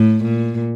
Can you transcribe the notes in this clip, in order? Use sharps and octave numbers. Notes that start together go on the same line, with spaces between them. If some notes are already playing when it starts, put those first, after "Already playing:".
Already playing: A2
A#2